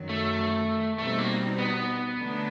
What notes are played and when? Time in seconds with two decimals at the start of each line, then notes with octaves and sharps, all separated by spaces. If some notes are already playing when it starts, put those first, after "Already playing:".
Already playing: F#2 D#3 F#3
0.09 A3
0.98 B2 G3 A3 C4 D#4
1.19 A#3
1.58 B3
2.18 D3 F#3 A3 D4